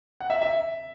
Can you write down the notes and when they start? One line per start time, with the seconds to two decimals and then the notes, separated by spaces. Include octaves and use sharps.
0.21 F#5
0.30 E5
0.42 E5